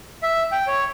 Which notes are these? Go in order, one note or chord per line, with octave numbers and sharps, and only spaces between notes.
E5
G5
C#5